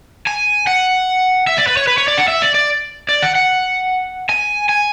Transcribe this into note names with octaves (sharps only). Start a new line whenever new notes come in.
G#5
F#5
E5
D5
B4
C#5
B4
C#5
D5
F#5
E5
D5
D5
D5
F#5
F#5
G#5
G#5